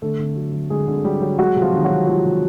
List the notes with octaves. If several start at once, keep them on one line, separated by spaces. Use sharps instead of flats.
D3 A3 A4
D3
F#3
F#3
D3 G#3 G#4
D3
F#3 G3 G4
F#3
F#3 G#3 F#4
C3
F3 F4
D#3
F#3 F#4
C3
F3 G#3 F4
C3